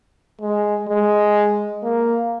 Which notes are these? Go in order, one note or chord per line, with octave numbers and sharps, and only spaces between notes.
G#3
G#3
A#3